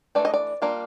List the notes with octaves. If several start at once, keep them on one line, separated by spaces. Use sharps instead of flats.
E3 A3 D4 D5
D#5
D5
G3 A#3 D4 F4